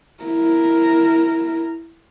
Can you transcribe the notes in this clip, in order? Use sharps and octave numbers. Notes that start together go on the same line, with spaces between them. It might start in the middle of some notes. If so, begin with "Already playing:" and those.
E4 A#4